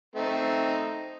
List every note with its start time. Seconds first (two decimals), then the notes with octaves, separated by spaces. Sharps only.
0.15 A3 C4 D#4